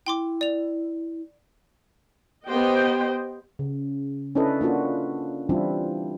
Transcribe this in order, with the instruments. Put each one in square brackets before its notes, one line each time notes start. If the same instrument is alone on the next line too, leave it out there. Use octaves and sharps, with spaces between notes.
[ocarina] E4 [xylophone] G5 C6 D6
[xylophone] D5 F7
[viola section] B3 G4 C5 D#5 G5
[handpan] C#3
C#4 D4 E4 A4 B4 D#5
A#3 D4 F4 F#4
E3 G3 C4 D4 E4 F4